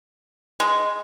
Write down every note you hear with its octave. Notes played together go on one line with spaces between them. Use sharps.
G#3